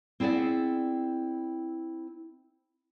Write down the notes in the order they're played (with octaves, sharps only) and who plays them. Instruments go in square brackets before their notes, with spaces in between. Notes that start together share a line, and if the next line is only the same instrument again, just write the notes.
[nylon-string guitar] C4 E4 G#4 C#5 D5 F#5